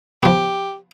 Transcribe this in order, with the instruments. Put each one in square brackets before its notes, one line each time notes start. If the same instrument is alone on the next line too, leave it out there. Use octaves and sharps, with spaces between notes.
[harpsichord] F3 B3 [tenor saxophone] G4